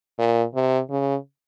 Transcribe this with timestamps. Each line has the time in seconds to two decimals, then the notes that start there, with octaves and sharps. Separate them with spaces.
0.19 A#2
0.55 C3
0.90 C#3